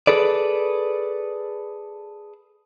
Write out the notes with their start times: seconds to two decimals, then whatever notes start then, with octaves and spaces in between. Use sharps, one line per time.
0.07 G#4 A4 B4 D5